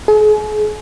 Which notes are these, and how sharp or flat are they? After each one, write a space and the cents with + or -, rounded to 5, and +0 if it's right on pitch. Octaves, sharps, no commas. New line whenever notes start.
G#4 +40